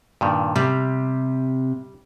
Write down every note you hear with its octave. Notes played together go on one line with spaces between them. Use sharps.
G2 A#2 D#3
C3 G3